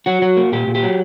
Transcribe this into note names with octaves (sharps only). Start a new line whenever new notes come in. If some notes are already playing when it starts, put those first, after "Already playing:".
F#3 F#4
F#3
A#3
A#2 G4
A#2
G4
F#3